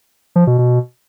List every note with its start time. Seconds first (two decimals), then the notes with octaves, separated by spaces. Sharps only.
0.36 F3
0.47 B2
0.58 B2